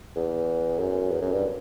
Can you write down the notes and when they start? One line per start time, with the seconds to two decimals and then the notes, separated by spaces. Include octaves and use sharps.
0.16 E2
0.79 F#2
1.11 E2
1.21 F#2
1.32 G2